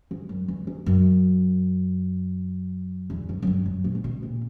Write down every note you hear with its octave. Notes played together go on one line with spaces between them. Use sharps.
E2
F#2
E2
E2
F#2
E2
F#2
F#2
G2
F#2
A#2
A#2
B2
A#2